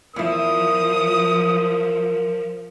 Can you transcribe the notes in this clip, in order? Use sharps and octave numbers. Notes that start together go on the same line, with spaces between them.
E2 F3 E4 A#4 D#6